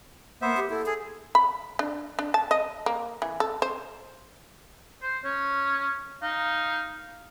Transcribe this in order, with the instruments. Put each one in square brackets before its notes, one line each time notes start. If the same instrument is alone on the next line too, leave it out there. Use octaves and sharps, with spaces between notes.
[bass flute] A#3 [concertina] B3 C5 E5
[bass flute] G4
[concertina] E4 [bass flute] A4
[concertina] G#4 [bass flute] A4
[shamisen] B5
D4
D4
A5
D#5
A#3
E3
A4
C5
[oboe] C5
[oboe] C#4 [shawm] C#5
[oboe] D#4 [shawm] F5